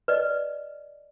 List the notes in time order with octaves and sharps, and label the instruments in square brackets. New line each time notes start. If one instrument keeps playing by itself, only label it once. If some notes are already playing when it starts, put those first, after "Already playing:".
[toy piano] B4 D5 D#5